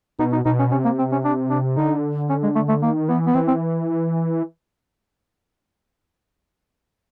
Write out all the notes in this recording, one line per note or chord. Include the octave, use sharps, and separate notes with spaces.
B2 D#4
D#4
B2 D#4
C#4
C3 C#4
A#3
C4
C#4
D4
D4
D3 D#4
C#4
G#3
A3
A3
D#3 A#3
E3 B3
B3
E3 C4
C4